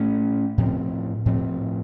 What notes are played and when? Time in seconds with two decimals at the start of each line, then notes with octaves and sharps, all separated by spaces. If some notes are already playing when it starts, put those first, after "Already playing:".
Already playing: A2 A3 C#4
0.58 A2 F3 C4
1.26 A2 F3 C4